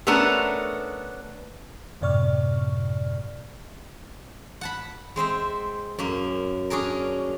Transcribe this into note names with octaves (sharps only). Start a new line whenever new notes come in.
A3 B3 C#4 D4 A4 A#4
F#2 A2 C3 D5 C#6 F6
F#5 A5 B5
G#3 C4 C5 E5
F#2 A#3
C#4 D4 G#4 A#4